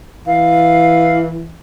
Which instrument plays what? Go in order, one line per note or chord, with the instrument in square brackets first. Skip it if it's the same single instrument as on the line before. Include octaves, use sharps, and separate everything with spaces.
[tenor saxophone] E3 [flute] F5